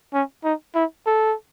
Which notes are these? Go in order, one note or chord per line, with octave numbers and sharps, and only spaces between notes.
C#4
D#4
E4
A4